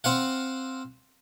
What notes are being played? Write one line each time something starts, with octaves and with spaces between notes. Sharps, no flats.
C4 F5 F#5